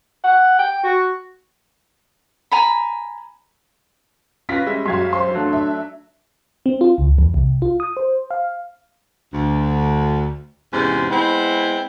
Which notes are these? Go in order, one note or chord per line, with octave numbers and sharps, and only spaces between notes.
F#5
G5
F#4
G#5 A#5 B5
C#4 F4 B4 A#6 B6
G3 G#3 E5
F#2 F#4 F5 C6 G#6
C5 C6
F#3 A3 D4
E5
C4
F4
C#2
E2
C2
F4
D#6
C5
F5
D2
E2 G#2 C3 C#4 C5
G#3 B3 C4 E4